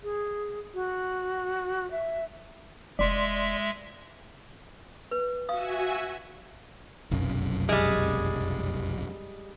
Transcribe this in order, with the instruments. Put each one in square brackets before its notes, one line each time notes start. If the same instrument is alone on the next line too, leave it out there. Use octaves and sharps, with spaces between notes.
[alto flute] G#4
F#4
E5
[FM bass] F1 [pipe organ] G#3 E5 [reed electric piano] D5 C6
[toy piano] B4
[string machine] F#4 E5 G#5 [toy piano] F5 D#6
[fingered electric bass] F1 B1 F#2
[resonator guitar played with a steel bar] G3 G#3